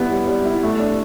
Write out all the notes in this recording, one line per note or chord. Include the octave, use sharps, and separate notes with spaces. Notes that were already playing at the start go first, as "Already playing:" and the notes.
Already playing: C3 G3 B3 E4
G3
G3
E4
A3
D4